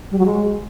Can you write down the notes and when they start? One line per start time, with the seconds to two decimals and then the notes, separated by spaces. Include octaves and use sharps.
0.11 G3
0.18 F#3
0.26 G#3